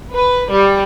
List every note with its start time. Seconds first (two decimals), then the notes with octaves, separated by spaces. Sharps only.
0.13 B4
0.50 G3